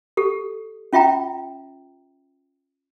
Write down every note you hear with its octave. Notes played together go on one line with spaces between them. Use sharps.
G4 A4
C#4 F4 E5 G5 A#5